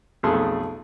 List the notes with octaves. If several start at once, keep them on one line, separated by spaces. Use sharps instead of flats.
B1 F2 A3 G#4 A4 C6